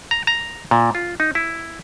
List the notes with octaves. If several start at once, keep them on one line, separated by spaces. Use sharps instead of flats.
A#5
A#5
A#2
F4
D#4
E4